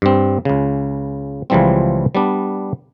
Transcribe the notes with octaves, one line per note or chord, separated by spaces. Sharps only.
G2 C4
C#2 C#3
C#2 C#3 E3 F3 G3 C4
G3 B3 D4